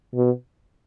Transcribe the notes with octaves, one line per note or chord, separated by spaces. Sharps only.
B2